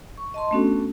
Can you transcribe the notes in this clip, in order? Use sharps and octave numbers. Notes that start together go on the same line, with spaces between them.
C#6
D#5 A5 C6
A3 B3 C#4 D4 F#4 A4